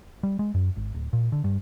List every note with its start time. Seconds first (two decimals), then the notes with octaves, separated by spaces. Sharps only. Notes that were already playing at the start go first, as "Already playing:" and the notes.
0.23 G3
0.39 G#3
0.54 F#2
0.76 G#1
0.95 D1
1.13 A#2
1.32 D3
1.44 G2